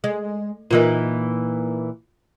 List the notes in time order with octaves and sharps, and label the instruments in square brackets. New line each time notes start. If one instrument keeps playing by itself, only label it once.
[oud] G#3
[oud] A#2 E3 D#4 [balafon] F4 A#4